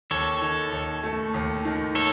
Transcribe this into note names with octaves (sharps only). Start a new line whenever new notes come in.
D#2 A4 C#5
D#3
D#2
A3
D#2
D#3
A4 C#5